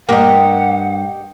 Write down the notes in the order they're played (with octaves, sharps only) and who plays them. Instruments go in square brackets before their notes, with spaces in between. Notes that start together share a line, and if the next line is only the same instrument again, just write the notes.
[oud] G2 A#3 [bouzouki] G4 D#5 [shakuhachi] F#5 [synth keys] G5